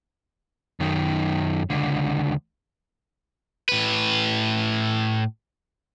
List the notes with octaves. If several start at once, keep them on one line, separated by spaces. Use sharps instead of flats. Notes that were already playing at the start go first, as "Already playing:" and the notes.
F#2 D#3
C#2 D3
A2 B4